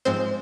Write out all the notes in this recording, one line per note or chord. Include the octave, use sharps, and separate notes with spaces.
G#2 F3 G#3 C4 C5